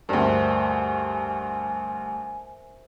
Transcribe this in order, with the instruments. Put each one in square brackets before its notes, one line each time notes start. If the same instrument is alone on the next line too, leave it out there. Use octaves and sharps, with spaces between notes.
[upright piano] D2 G2 [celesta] A#4 C5 E5 [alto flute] G#5